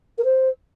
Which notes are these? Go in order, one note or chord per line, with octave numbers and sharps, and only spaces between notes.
A#4
C5